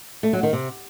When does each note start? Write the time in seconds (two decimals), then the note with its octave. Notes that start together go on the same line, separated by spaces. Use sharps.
0.23 A3
0.33 F#3
0.43 D#3
0.53 C3